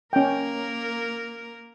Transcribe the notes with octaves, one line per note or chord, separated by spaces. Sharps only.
A#3 C#4 A#4 G5